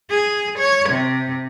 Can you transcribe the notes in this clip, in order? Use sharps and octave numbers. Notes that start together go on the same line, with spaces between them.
G#4
C#5
C3